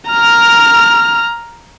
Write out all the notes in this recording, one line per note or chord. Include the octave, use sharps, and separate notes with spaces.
A#5 F6